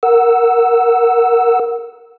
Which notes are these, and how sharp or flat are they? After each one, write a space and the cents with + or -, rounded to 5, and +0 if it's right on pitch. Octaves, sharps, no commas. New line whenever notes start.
A#4 +0 F#5 +0 E6 +0